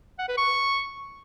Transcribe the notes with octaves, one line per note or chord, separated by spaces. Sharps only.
F#5
B4
C#6